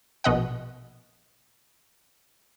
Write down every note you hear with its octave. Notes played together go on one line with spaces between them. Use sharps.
A#1 B2 D#5 F#5